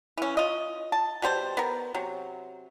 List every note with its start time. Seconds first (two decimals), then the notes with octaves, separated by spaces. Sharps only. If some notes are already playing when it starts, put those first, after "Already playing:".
0.17 E3 C#4
0.37 F4 D#5
0.92 A5
1.22 B2 G3 C5 A5
1.57 B3 A#4
1.94 C3 F#3